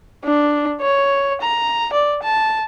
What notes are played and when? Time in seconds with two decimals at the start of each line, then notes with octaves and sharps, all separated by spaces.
0.24 D4
0.81 C#5
1.41 A#5
1.93 D5
2.23 A5